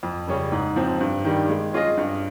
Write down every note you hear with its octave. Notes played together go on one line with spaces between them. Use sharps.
F2
C#3 G3 C#4 G#4
G#2
F3 C4
G2
D#3 G3
G#3
C#4 F4 G#4 D#5
G2